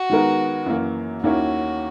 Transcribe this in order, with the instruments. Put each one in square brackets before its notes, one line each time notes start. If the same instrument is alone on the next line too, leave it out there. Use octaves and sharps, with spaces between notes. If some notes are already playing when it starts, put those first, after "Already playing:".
Already playing: [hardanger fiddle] F#4
[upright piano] D#3 G#3 B3 D#4 A#4
F#2 E3 A#3
[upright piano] D#2 D#3 A#3 C#4 E4 [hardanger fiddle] F#4